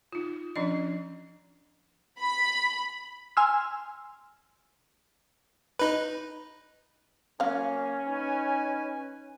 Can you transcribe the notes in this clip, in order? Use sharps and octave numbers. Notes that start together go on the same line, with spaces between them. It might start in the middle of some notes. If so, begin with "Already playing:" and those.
D#4 F4
F3 C#4 D4 D#5
B5
G#5 C6 E6 F6
D#4 B4
F#3 A#3 C#4 F5
D#4 B4 G#5